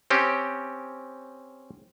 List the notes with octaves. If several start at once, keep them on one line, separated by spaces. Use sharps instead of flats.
C4 C#4 G4